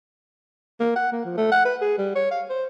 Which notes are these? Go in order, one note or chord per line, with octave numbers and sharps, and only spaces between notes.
A#3
F#5
A#3
F3
A3
F#5
B4
G#4
G3
C#5
F5
C5